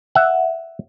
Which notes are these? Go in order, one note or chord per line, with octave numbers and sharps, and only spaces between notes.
E5 F#5